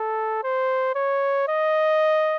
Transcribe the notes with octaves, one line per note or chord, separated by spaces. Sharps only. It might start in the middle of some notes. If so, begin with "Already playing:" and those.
Already playing: A4
C5
C#5
D#5